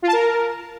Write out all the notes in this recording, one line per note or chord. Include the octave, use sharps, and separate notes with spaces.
F4
A5
A#4